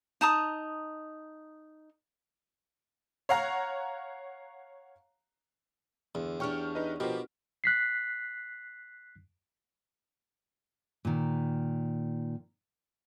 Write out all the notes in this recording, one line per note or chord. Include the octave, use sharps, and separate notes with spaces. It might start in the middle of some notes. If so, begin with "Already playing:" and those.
D#4 A5 A#5 D#6
C#5 F5 F#5 A#5
E2 D3
D4 G4 C#5 G5 C#6 F6
D#4 B4 D#5
B2 F3 G4 A#4 C5
F#6 B6 C7
A#2 D#3